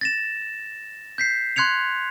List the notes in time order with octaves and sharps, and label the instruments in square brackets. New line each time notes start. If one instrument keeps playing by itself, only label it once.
[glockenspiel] A6 A#6 E7
G6 B6 C7
C6 F#6 G#6 C#7 F7